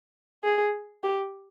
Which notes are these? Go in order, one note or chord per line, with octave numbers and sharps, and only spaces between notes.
G#4
G4